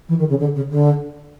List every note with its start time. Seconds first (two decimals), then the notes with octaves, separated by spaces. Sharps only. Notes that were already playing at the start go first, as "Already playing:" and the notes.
0.08 E3
0.19 D#3
0.29 C#3
0.39 D3
0.55 C#3
0.70 D3